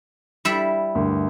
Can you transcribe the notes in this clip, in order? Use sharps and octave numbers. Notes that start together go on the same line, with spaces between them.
G3 E4 E5
D2 G2 A#4